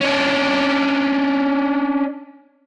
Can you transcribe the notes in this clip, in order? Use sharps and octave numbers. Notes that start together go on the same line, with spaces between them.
C#4 D4